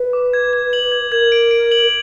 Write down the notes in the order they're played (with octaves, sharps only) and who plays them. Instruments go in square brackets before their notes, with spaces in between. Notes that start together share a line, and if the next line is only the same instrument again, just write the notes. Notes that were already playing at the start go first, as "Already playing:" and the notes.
Already playing: [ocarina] B4
[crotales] D6
G#6
G#6
F#7
G#6
[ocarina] A#4 [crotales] G#6
[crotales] D7
D7
F#7